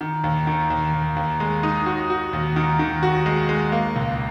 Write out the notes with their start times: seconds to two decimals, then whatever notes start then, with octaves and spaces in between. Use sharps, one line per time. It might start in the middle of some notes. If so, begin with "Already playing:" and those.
0.01 D#3
0.24 D#2
0.47 D#3
0.70 D#2
0.94 D#2
1.16 D#2
1.40 G#3
1.63 D#4
1.86 F#4
2.10 F#4
2.33 D#2
2.56 D#3
2.79 D#3
3.03 F#4
3.26 G#3
3.49 G#3
3.72 A#3
3.96 C#2